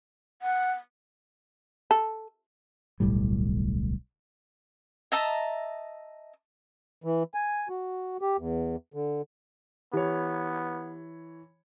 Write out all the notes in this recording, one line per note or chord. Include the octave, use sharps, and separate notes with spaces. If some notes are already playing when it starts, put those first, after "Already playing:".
F#5
A4
D1 B1 A2 G3
D#5 E5 A5 A#5
E3
G#5
F#4
G4
E2
D3
E3 B3 G4 C#5